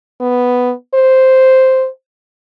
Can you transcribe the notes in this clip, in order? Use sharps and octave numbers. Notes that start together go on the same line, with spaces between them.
B3
C5